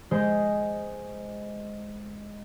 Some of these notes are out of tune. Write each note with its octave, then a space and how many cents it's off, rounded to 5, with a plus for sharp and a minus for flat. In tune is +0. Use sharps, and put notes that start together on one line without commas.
G#3 +0 C5 -10